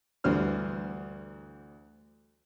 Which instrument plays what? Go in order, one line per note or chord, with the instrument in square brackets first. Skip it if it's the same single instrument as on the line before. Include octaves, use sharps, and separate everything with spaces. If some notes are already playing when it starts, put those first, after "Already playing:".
[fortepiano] D2 G2 D3 E3 C5 F6